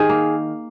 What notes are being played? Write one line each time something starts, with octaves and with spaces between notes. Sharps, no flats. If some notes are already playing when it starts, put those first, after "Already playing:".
Already playing: D#3 G#4
A#3